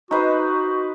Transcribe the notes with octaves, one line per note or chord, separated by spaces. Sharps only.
D#4 F#4 B4 C5